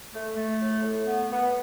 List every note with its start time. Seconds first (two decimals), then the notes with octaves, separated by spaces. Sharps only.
0.13 A3
0.36 A3
0.60 A2
0.83 A2
1.06 B3
1.30 B3